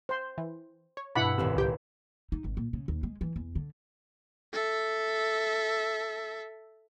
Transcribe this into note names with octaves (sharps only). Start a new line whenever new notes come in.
C5 C6
E3
C#5
G2 B2 D4 E4 F#5 B5
D#1 A1 C3 E6
C#2 G4 G5
D#4
G#1
A#2
C#3
D#2
G#3
E3
E2
D3
A4 E5